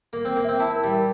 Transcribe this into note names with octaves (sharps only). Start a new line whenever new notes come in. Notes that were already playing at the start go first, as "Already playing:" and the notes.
A#3 A#4
C4 A#4
A#3
C4 E5
E4 A5
A#4
G3
A#4